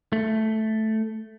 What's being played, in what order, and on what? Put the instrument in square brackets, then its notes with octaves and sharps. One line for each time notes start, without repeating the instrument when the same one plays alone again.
[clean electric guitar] A3